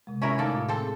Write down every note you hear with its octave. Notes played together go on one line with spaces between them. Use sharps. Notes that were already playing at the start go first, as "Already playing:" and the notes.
C3 G#3
C#4 E4 A#4
A3 A#3 D#4 A4 D5
A2 F4
C4 A4 C5
G#4